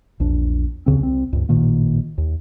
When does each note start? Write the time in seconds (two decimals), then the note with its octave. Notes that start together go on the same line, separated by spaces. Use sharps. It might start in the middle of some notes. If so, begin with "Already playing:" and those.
0.20 A#1 E2 D4
0.86 D#2 C#3 C4
1.00 C2 C4
1.33 C#2 G2
1.49 A1 A#2 D#3 A#3
2.18 D#2